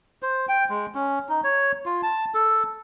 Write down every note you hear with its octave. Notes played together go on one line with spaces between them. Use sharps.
C5
G5
G#3
C#4
D#4
C#5
F4
A5
A4